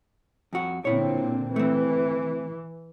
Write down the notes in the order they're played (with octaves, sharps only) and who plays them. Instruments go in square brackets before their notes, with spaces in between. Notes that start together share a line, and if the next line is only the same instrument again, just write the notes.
[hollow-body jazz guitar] F2 F#4
[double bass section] A#2 D3 C4 [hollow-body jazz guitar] E4 C#5
[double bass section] E3 [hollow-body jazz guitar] A3 C4